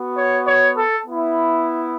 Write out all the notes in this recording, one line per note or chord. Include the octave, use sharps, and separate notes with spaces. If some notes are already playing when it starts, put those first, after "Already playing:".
Already playing: B3 F#4
C#5
C#5
A4
B3 E4